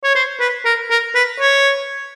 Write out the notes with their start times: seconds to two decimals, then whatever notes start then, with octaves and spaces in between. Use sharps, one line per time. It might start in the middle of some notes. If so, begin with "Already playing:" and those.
0.04 C#5
0.15 C5
0.40 B4
0.65 A#4
0.90 A#4
1.15 B4
1.40 C#5